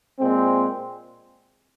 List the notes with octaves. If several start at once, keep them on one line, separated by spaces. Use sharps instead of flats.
A#2 G#3 C4